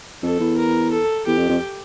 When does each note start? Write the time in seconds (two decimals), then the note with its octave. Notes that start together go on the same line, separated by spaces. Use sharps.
0.23 F2 A4
0.40 E2
0.57 A#4
0.91 A4
1.26 E2 G4
1.37 F2
1.49 F2